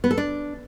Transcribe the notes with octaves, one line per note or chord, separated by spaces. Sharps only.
B3
A4
D4